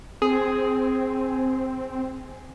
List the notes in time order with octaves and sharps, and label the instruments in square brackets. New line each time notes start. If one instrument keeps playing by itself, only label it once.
[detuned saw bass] C4 [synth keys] G#4